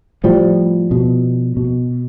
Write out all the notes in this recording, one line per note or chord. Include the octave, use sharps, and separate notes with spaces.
A2 F3 G3
B2
B2